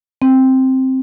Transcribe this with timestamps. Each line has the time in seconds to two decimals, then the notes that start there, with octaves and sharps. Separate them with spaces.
0.22 C4